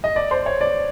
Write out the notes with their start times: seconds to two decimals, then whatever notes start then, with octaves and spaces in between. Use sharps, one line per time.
0.04 D#5
0.16 D5
0.31 C5
0.46 C#5
0.61 D5